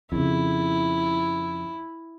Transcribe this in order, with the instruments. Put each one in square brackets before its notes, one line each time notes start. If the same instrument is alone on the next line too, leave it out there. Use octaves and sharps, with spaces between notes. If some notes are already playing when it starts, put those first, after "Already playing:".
[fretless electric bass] F2 C#3 [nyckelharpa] E4